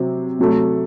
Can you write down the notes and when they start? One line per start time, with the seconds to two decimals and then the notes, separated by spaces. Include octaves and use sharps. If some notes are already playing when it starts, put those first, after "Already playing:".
Already playing: C3 F#3 C4
0.39 C3 F#3 A3